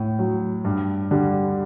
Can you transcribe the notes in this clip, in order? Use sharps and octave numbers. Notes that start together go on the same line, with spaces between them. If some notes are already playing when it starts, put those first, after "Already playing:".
Already playing: A2
F#3
G2
D3 G3